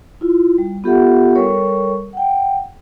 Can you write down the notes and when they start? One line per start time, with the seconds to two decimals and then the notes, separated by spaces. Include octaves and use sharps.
0.21 E4 F4
0.58 G3
0.84 B3 F4 G4 A4 E5 F#5
1.35 G3 A4 A#4 C#5 C#6
2.13 F#5 G5